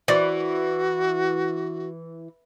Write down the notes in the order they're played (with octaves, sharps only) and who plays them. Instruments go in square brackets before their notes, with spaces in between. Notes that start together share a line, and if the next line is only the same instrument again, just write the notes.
[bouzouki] E3 [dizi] F#4 [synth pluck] C5 D5 C#6